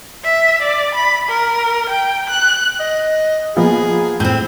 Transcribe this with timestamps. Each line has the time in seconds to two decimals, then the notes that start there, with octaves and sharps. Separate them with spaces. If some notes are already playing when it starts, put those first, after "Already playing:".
0.24 E5
0.62 D5
0.95 B5
1.29 A#4
1.89 G5
2.30 F#6
2.80 D#5
3.56 F3 A#3 B3 G#4
4.20 A2 C4 G6